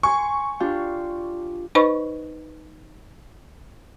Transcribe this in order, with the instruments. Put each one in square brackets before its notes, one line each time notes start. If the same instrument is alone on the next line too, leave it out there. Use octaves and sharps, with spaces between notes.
[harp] G#5 C6 [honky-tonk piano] C#6
[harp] D4 F4 G4
[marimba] D#4 B4 C5 D#5 B5 C#6